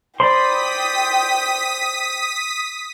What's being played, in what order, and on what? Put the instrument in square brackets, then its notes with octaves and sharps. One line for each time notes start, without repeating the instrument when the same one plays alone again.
[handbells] C5 [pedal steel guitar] D5 B5 C6 [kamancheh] G5 [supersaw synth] D#6 B6